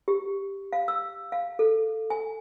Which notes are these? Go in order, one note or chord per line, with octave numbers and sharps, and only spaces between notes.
G4
F5
E6
F5
A4
G#5